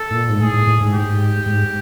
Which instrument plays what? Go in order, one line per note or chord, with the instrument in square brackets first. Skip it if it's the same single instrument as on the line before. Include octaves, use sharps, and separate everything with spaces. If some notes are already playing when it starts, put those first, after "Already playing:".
Already playing: [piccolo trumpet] A4
[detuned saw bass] A2
A#2
G#2
[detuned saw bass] A2 [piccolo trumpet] G#4
[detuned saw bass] A2
A2
G#2
[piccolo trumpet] G4
[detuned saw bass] G#2